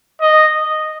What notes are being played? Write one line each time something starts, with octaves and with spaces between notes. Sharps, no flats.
D#5